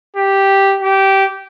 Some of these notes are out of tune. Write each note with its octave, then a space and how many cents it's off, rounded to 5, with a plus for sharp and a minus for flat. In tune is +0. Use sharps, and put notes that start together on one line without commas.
G4 -5
G4 -15